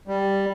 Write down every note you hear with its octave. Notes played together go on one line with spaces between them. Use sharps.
G3